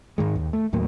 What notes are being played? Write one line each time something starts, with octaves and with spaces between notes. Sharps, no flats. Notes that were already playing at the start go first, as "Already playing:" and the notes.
G#2 D#3 G#3
D#2
A3
D#2 A2 F#3 A#3